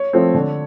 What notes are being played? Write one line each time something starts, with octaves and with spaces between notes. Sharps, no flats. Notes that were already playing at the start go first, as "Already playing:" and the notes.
Already playing: C#5
F3 A3 C4
D3